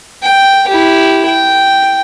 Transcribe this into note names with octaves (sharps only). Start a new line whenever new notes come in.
G5
E4 G4
G5